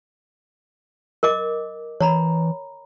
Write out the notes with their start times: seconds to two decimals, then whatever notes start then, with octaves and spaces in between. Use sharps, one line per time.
1.23 A#4 D#5 D6
2.01 E3 C#5 A#5 B5